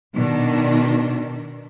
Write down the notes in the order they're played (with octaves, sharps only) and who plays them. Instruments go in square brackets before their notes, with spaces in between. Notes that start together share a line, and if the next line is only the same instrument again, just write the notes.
[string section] B2 D#3 D4